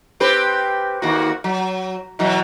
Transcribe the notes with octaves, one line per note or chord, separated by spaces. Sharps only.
C4 G4 B4
D#2 A#3 F#4
F#3
B2 E3 F#3